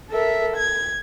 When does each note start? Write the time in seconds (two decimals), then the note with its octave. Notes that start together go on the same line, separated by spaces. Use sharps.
0.10 A4 A#4 E5
0.55 G#6